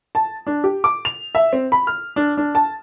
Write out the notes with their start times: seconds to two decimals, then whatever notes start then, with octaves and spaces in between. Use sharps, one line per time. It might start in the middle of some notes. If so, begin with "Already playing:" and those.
0.15 A5
0.47 D4
0.64 G4
0.84 D6
1.05 F7
1.35 E5
1.53 C4
1.72 B5
1.87 F6
2.16 D4
2.37 D4
2.55 A5